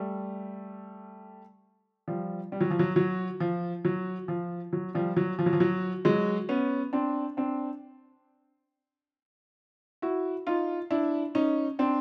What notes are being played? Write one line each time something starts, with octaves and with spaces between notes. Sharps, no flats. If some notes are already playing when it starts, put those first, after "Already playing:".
Already playing: G3 A3
F3 G3
G3
F#3
F3
F#3
F#3
F3
F#3
F3
F#3
F3 G3
F#3
F3
F#3
F3
F#3
F#3 G#3
B3 C#4
C4 D4
C4 D4
E4 F#4
D#4 F4
D4 E4
C#4 D#4
C4 D4